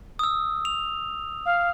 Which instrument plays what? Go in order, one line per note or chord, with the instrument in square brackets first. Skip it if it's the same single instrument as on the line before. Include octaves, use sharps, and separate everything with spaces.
[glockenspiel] D#6 E6
F7
[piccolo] F5